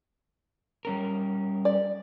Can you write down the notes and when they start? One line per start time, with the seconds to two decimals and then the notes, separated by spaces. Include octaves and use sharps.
0.85 G3 C#4 A#4
1.65 D5